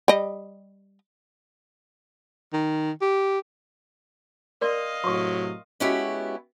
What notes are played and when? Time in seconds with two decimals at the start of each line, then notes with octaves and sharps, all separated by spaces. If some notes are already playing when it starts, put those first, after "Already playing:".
0.08 G3 D#5
2.53 D#3
3.01 G4
4.61 A#4 D5 D#5 F5 C6
5.04 A2 C3 F#3 C6 C#6
5.80 G#3 B3 C#4 E4 F#4 G4